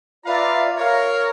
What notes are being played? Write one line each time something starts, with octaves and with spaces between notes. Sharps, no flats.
F4 B4 D5 E5 F5 A#5
A#4 C#5 F5